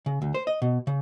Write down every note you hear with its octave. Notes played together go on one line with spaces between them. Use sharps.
C#3
D2
C5
D#5
B2
C#3